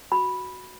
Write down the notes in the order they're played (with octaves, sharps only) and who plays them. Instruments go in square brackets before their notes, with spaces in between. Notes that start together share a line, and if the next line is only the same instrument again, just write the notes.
[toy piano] F#4 B5